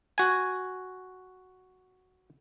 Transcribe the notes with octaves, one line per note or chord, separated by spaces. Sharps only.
F#4 G#5